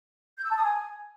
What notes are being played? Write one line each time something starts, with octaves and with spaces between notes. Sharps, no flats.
G6
E6
A5
D#6
G#5